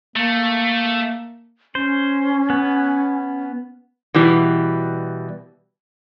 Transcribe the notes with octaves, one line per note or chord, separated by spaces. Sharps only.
A3 A#3
C#4 C5
B3
B2 E3 G3